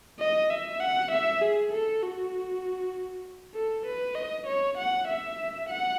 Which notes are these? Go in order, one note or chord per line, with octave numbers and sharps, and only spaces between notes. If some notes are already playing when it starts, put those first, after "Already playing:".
D#5
E5
F#5
E5
G#4
A4
F#4
A4
B4
D#5
C#5
F#5
E5
F#5